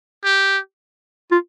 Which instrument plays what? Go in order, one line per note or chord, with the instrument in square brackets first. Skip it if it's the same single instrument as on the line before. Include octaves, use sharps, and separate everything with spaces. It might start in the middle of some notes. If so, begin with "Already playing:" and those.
[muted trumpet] G4
[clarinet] F4